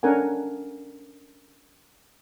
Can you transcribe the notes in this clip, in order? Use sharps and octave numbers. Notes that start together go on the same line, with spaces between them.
C#4 D4 A4 A#4 F#5 G#5